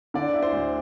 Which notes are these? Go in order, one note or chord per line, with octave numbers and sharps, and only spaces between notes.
D3 D5
E4
C5
D2